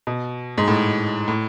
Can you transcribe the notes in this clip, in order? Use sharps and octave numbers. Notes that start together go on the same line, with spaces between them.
B2
G#2
A2
A2